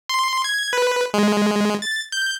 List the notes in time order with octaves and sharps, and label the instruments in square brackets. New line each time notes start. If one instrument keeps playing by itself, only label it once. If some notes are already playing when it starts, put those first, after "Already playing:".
[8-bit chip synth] C6
G#6
B4
G#3
A6
G6